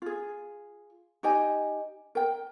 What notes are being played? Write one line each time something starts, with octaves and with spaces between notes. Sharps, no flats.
F4 G#4
D#4 G4 D#5 G#5
A#4 G5